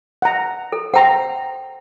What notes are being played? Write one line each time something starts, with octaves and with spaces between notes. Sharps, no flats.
F#5 A#5
A4
C5 F#5 G5 A#5 C6